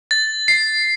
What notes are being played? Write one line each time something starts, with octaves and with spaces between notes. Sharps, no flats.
A6
C7